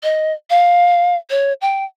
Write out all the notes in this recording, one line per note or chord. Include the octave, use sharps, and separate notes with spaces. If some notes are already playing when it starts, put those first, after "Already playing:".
D#5
F5
C#5
G5